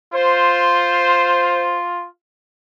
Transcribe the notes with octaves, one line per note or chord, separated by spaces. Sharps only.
F4 C5